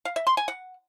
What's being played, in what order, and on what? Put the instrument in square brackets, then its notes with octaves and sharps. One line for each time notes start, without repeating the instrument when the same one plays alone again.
[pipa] F5
E5
C6
G#5
F#5